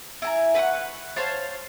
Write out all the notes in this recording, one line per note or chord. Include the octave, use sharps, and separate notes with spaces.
E4 G#5 A#5
B4 E5 F#5 C#6
C5 C#5 F5 A5